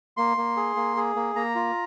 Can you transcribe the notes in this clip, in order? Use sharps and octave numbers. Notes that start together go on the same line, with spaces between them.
A#3 C6
A#3
G#4
A#3
G#4
A#3
A#3 A#5
F4